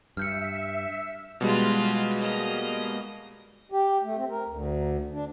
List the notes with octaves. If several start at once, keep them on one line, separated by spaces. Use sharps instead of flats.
G2 E5 F6 G6 C#7
B2 G3 G#3 F4 F#4
A#3 D#5
G4
A3
C4
A#4
D2
D4